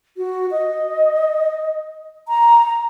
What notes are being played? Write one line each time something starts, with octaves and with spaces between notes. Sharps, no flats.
F#4
D#5
A#5